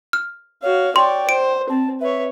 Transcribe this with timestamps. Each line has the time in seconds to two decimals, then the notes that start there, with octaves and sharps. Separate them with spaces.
0.13 F6
0.62 F#4 C#5 F5
0.96 C#5 D5 G5 C6
1.29 C5 D7
1.69 C4 A5
2.01 B4 C#5 E5